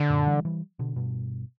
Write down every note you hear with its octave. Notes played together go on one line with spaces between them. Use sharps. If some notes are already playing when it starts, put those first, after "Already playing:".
Already playing: D3
F#2 A#2
E3 G3
E3 G3
B2 D3
G2 B2